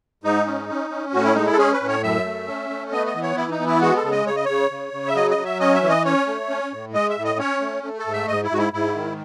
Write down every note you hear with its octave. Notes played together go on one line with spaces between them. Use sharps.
G#2 D#4
C#4
C#4
C#4
A2 F#4
E4
G#3 D#4
E4
A4
C#4 G#4
B4
A2
C#5
F#2 E5
A3
C#4
A3
B3 D#5
D#5
E3
C#5
E3 E4
D#4
B3
E4
G#3 F#4
A4
C#3
D#5
C#3 C#5
D#5
C#3 C#5
C#3
C#3
E5
F#3 D#5
D#5
F#3
E5
C#4 D#5
E5
E3
D#5
C#4 C#5
A3
C#4
A2
G#3 D#5
E5
A2
D#5
C#4 C#5
A3
A3
A4
G#2
E5
G#2 D#5
E4
G#2 F#4
E4
G#2 E4
D#3